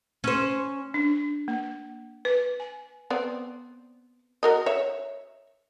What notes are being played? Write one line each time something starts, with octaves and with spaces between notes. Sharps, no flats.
C#4 C5
D4
A#3
B4
G#5
B3 C4 D5
F#4 A#4 D#5
C#5 E5